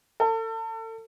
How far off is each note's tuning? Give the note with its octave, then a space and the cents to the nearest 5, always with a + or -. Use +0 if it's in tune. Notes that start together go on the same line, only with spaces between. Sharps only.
A4 +35